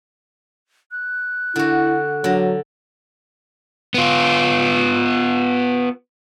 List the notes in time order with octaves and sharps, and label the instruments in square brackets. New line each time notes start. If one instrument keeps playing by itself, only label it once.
[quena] F#6
[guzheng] D3 F#4 [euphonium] E4
[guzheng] D3 A#5 [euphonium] F#3
[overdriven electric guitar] B3 F4